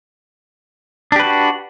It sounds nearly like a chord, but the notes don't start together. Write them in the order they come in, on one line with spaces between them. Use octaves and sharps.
D4 G4 B4 F#4